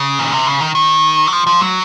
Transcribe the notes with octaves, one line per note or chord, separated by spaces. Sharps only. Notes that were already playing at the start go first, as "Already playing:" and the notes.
Already playing: C#3
A#2
C3
C#3
D#3
D#3
F#3
F3
F3
F#3